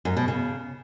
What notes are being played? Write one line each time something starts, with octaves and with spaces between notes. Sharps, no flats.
F#2
B2
C#3